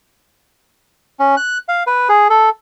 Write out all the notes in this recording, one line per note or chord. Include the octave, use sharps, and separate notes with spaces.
C#4
F#6
F5
B4
G#4
A4